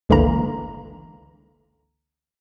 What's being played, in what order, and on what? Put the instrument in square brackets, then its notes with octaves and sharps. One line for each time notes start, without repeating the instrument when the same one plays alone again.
[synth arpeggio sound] G1 C#2 D3 E3 A#3 A#5